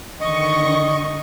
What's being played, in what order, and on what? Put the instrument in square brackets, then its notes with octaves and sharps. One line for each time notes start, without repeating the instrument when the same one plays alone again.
[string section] D3 D#3 C#6 [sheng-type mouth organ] D#5